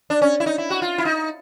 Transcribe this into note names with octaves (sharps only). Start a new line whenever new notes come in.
D4
C#4
E4
D#4
E4
F#4
F4
E4
D#4